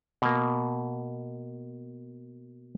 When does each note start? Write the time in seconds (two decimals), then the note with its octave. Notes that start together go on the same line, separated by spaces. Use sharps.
0.22 B2 A#3